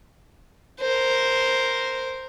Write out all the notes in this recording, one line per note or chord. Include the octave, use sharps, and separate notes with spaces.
A#4 C5